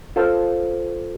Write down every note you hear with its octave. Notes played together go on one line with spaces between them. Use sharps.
F4 A4 C5